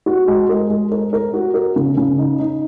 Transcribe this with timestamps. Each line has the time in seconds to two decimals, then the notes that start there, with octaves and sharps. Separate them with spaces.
0.06 F#4
0.28 G#3
0.49 A#4
0.70 G#3
0.92 A#4
1.13 A#4
1.34 F#4
1.54 A#4
1.76 C#3
1.97 C#3
2.18 D#4
2.39 D#4